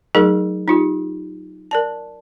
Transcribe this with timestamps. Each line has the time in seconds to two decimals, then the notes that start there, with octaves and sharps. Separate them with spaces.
0.15 F#3 A3 D#4 G#4 A#4 C#6
0.68 D#4 F4 G4
1.71 A#4 D5 A5